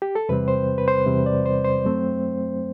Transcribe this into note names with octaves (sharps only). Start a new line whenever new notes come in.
G4
A4
E2 C3 G3 C4 B4
C5
B4
C5
E2 C3 G3 C4
D5
C5
C5
F#2 F#3 A3 C4